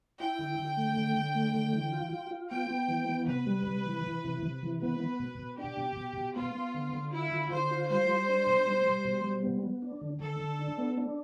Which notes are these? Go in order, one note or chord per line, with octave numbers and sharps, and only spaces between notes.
E4 G5
D3
D3
A3
D3
D3
A3
D3
E3
F4
F4
F4
B3 G5
B3
E3
B3
C3 B4
G3
C3
E3
E3
C3
C3
E3
B3 B4
B3
B2
B2
D4 G4
B2
B2
B2
B3 F4
B3
D3
D3
E4 F4
D3
D3 C5
F4
G3 C5
G3
D4
B2
G3
G3
B2
G3
B3
B3
D4
D3
D3 A4
D3
D4
B3
D4